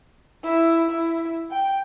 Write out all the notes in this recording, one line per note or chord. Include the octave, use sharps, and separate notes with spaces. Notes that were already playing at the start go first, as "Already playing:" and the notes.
E4
E4
G5